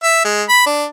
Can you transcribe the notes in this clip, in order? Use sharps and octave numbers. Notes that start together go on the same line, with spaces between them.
E5
G#3
B5
D4